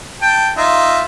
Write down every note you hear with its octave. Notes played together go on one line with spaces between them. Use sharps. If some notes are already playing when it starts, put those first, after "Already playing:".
G5 A5
D#4 F4 E5